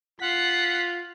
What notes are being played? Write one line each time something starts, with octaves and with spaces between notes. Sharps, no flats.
F4 F#5 B6 C7